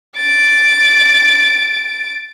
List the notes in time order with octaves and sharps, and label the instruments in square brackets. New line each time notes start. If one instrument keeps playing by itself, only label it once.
[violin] A6 D7